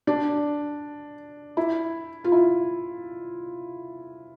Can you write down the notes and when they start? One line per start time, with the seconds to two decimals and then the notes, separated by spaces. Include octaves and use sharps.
0.07 D4
1.57 E4
2.24 F4
2.32 E4